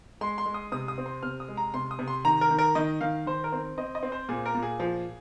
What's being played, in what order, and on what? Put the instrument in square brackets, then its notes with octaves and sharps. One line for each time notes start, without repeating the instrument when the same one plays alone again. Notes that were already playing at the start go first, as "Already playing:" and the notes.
[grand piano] G#3 C6
C6
G#3
D#6
C3 D#6
D#6
C4
C6
C3 F6
D#6
G#3
A#5
C3 C6
D#6
C3
C6
D#3 A#5
A#4
D#3
A#4
D#3 D#5
D#3 F5
D#3 C5
A#4
C4
C4 D#5
D#5
C4
C5
A#2 G#4
A#4
A#2
G#4
F3